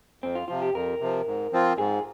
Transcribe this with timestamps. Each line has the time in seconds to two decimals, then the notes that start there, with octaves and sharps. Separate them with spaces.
0.22 F2 C4
0.35 F4
0.48 C3 F3 F4
0.62 G4
0.74 F2 A#4
1.01 C3 F3
1.27 G#2
1.52 F3 C4 F4
1.78 G#2 G#4